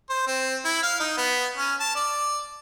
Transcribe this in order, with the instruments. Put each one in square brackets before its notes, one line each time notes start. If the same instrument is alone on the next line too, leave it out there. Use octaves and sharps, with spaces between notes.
[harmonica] C5
C4
E4
F5
D#4
B3
C#4
A5
D5